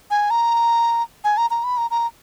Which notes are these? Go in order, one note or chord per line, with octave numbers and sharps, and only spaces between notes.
G#5
A#5
G#5
A#5
A#5
B5
A#5
A#5